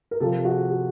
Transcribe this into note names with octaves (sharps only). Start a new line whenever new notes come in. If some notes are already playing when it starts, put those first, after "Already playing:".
A#4
C3 F3 G4 A4
F#4 G#4
G4